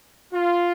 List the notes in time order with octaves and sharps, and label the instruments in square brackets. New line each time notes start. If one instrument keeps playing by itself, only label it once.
[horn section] F4